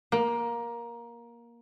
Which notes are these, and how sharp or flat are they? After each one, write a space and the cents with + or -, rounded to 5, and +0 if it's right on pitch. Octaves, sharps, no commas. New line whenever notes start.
A#3 +15